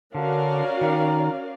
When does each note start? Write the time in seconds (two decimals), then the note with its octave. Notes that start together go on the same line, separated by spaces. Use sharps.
0.14 D3 C#4 F#4 A#4 D5 F5
0.81 D#3